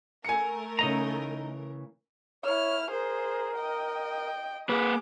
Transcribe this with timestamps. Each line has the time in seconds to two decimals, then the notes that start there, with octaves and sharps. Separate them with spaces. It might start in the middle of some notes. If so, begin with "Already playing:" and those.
0.25 A3 A#4 G#5 C#7
0.79 C#3 E3 D#4 D#5 A#5
2.44 E4 C#5 F6
2.91 G#4 A#4 C5
3.57 D#5 G5
4.69 A#3 G#4 B4 D6